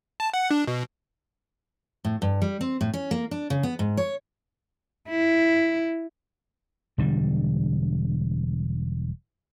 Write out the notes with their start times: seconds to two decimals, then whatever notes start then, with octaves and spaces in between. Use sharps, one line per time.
0.20 A5
0.34 F#5
0.51 D4
0.67 B2
2.05 A2
2.22 G2
2.42 G3
2.61 C4
2.81 A2
2.94 C#4
3.11 A#3
3.31 D4
3.50 C#3
3.63 B3
3.79 G#2
3.97 C#5
5.09 E4
6.98 E1 D3 G3